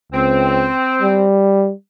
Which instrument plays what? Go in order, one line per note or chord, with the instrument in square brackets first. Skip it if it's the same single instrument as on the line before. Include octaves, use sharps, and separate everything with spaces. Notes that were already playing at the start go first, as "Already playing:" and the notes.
[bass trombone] C#2 [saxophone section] C4
[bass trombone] G3